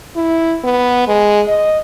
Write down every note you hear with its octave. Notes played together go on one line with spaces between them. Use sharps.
E4
B3
G#3
D#5